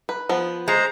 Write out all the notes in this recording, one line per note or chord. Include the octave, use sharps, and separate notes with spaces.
B4
F3 B3
G#3 C5 A#5